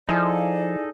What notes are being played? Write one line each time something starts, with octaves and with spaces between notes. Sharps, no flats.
F3 D#4 E4 G#4 A4 D5 G#5